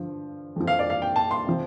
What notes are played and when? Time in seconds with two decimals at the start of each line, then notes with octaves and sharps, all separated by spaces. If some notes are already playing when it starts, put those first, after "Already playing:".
Already playing: G2 D3 F3
0.56 F2 F3
0.67 F5
0.79 D5
0.90 F5
1.02 G5
1.16 A5
1.31 C6
1.47 C3 F3